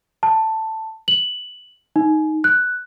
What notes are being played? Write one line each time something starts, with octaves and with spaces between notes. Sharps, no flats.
A5
F#7
D#4
F#6